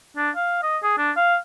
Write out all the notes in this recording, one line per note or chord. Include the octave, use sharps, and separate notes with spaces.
D4
F5
D#5
G#4
D4
F5